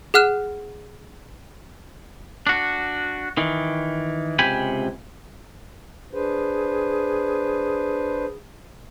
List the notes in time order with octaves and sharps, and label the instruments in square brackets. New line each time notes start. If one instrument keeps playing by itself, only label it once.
[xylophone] G#4 F#5 F6 F#6 E7
[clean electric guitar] D4 F#4
D#3 E3
C#2 C3 G5 G#5 B5
[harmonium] D4 B4 C5 [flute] G#4